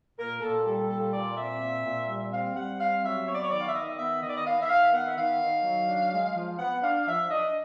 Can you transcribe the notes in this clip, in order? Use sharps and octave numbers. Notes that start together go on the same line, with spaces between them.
A#2 A#4
A#2 A4
G3 A4
A#2 A4
A#2 D5
C4 E5
A#2
A#2
G3
C4 F5
G3 F#5
C4 F5
F#3 E5
B3 C#5
D5
C#5
D#3 D5
F5
E5
D#3 D#5
B3 E5
D#3 D#5
D5
D#5
D#3 F5
E5
D#3 F5
B3 F#5
E5
D#3 F5
D#3
F#3
D4
G#3
F3
B3 F#5
D4 F5
F3 E5
D4 D#5